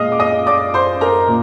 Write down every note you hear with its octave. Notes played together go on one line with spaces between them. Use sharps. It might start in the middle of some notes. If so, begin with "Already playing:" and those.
Already playing: A#2 G#3 D#5 F5 D#6
D6
D#5 D#6
D5 D6
C5 C6
A#4 A#5
A#2